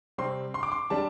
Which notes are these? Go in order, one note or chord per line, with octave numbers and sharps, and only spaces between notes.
C3 G3 C4 C6
C6
D6
C6
G3 D4 A5